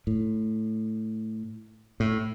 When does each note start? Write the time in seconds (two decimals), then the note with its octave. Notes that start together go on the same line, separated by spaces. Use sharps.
0.07 A2
2.00 A2